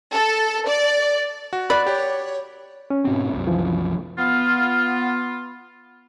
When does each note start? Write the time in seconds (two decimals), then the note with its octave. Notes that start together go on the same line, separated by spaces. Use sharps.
0.15 A4
0.68 D5
1.53 F#4
1.70 D5 B5 F#6
1.87 G4 C#5
2.90 C#4
3.05 G#2 B2 C4
3.33 C2 F#2
3.47 E3 F3
4.19 B3 F4